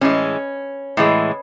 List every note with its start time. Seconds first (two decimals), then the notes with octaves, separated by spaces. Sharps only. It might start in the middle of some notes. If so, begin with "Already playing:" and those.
0.01 A2 E3 G#3 C#4
0.97 A2 E3 G#3